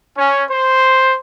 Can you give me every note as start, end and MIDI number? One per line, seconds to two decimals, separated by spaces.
0.18 0.43 61
0.49 1.17 72